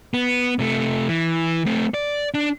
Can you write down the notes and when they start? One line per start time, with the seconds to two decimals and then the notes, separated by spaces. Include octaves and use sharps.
0.14 B3
0.59 C3 A3
1.09 E3
1.66 A3 C4
1.94 D5
2.34 D4